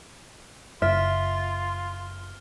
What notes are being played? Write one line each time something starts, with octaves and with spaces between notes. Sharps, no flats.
F#1 F4 E5 F6